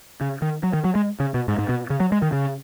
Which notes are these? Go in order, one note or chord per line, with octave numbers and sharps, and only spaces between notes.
C#3
D#3
F#3
D#3
F#3
G#3
C#3
B2
G#2
G#2
B2
C#3
F#3
G#3
D#3
C#3